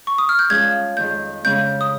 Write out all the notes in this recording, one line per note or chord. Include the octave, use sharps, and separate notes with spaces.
C#6
D#6
F6
G6
F3 G#3 C#4 G#6
F2 D#3 G#3 G6
C#3 G#3 C#4 G6
D#6